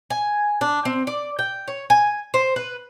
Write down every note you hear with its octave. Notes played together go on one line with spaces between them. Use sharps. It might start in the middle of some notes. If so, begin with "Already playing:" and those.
G#5
D4
C4
D5
G5
C#5
G#5
C5
B4